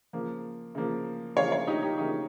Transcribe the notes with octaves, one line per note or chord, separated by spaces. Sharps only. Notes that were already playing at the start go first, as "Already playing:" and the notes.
C#3 F3 A#3
C#3 F3 A#3
C#3 F3 A#3 C#5 F5
C#5 F5
D#4 G4
D#4 G4
C#3 F3 A#3 D#4 G4